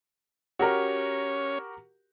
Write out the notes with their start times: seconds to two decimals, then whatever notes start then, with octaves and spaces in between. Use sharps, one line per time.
0.59 C#4 F#4 G4 A#4 C#5